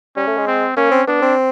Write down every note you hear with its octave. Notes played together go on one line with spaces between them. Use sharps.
G3 C#4
A3
G#3
C4
A#3 C#4
C4
B3 D4
C4